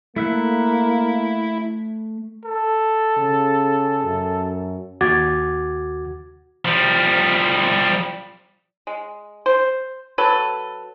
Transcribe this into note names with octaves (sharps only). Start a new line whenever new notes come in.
A3 A#3 E4 E5 F#5
A4
C#3
F#2
D#2 F#4 D6 G#6 A6
F3 G3
G#3
C5
F#3 A4 B4